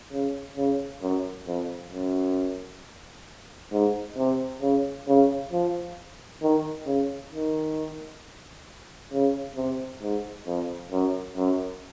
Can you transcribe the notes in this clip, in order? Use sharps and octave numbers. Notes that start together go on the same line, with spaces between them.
C#3
C#3
F#2
F2
F#2
G#2
C3
C#3
C#3
F3
D#3
C#3
D#3
C#3
C3
G#2
F2
F#2
F#2